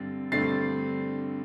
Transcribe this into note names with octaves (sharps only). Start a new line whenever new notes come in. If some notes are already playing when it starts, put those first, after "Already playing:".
Already playing: G2 D3 C4 A6
G2 D3 A3 C4 A6 C7